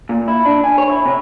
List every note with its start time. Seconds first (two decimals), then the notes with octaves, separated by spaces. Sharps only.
0.09 A#2
0.28 E4
0.45 D4
0.64 G#5
0.78 C#5
0.90 E4
1.06 C3